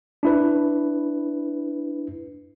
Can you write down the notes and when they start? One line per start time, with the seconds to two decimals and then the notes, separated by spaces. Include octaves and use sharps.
0.23 D4 E4 B4